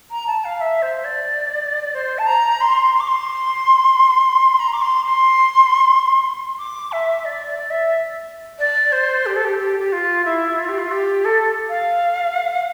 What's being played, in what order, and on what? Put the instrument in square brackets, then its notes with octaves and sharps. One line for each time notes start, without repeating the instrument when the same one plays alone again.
[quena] A#5
A5
F5
E5
C5
D5
C5
A5
A#5
C6
C6
D6
C6
A#5
D6
C6
C6
D6
E5
D5
D5
E5
D5
C5
G4
A4
G4
G4
G4
F4
E4
F4
G4
F4
G4
A4
F5